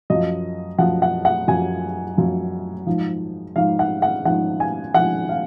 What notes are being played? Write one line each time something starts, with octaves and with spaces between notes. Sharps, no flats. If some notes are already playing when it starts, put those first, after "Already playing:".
F#2 F3 D#5
F#2 F3 F#5
F#5
F#5
F#2 F3 G#5
F#2 F3
G#2 F3
G#2 F3 F5
F#5
F#5
G#2 F3 F#5
G#5
G#2 F3 F#5
F5